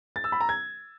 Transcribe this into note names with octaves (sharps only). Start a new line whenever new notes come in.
A6
E6
B5
A#5
G#6